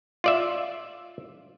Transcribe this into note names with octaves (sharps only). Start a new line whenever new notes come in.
F4 D5 E5